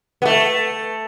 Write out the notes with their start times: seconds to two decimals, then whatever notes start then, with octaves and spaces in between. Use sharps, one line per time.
0.22 B3
0.25 A3